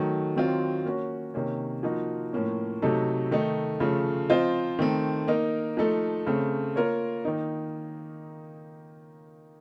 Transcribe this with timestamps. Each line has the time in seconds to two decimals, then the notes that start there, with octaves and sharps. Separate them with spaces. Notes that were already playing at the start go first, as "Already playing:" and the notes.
Already playing: D#3 F#3 A3
0.36 D#3 F#3 C4 F4
0.85 A#3 C#4 F#4
1.34 C3 D#3 A#3 C#4
1.83 F3 A#3 D#4 F#4
2.33 A2 F3 A#3 C#4
2.82 C3 F#3 A3 D#4 A4
3.31 D#3 A3 D#4
3.80 C#3 F3 A3
4.30 F3 C4 F4 C5 D#5
4.79 D#3 A3 C4
5.28 A#3 D#4 A#4
5.77 F3 A3 D#4 A4
6.26 C#3 A3 C4
6.76 A#3 F4 A#4 C#5
7.25 D#3 A#3 D#4